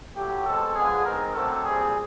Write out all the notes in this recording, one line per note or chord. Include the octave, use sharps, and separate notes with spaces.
A2 F#3 A3 G4
B2 G#3 C4 A4
D3 F3 G#3 B3 G#4
D#3 G#3 C4 A#4
D3 F#3 A3 C4 A4
A#2 G3 C4 G#4